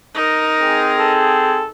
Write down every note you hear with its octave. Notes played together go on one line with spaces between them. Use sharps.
D#4 A#4
C4 G#4
A4